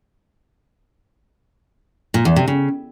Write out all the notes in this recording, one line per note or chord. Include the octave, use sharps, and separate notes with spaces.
A#2
E2
C3
C#3